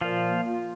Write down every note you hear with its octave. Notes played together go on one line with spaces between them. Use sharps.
A#2 F3 F4
A#3
F4